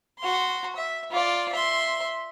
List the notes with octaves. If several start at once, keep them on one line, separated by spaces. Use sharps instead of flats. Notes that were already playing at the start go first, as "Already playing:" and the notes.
F#4 C6
E5
F4 D5
E5 C6